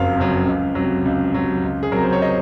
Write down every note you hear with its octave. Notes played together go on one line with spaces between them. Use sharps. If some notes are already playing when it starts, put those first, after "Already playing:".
Already playing: F#1 F2 C#3 F#3 F5
F2 C#3 F#3
C#2
C3 F#3
C#2
C3 F#3
C#2
G#4
C3 F#3 A#4
C5
C#5
D#5